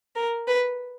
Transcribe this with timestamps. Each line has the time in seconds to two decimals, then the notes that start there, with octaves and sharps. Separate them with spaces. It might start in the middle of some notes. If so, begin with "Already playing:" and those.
0.16 A#4
0.47 B4